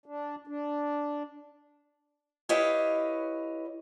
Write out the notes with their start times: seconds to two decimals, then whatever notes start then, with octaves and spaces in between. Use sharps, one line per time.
0.06 D4
0.47 D4
2.49 E4 G4 B4 C#5 D#5 F5